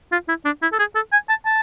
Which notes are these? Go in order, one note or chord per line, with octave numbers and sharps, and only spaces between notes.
F4
E4
D4
E4
A4
G#4
A4
G#5
A5
A5